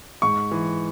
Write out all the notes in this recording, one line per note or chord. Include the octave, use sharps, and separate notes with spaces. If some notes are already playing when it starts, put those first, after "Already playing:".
G#2 C#6
E3